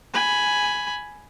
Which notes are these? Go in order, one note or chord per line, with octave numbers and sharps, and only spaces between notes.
G#5 B5